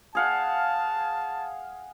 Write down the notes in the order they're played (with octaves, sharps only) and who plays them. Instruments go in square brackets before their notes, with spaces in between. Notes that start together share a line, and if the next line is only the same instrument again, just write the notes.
[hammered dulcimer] G#4 F5 F#5 [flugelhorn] A5